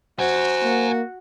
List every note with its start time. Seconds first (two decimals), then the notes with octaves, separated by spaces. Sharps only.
0.19 F#4 C5 F#5 G#5
0.63 A#3